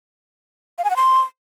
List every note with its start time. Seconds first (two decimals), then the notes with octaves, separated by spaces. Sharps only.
0.78 F5
0.84 G#5
0.90 F#5
0.96 C6